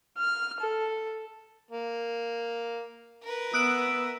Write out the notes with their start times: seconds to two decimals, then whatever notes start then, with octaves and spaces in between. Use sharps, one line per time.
0.19 F6
0.61 A4
1.71 A#3
3.23 A#4 B4
3.53 B3 E5 D#6 F#6 D7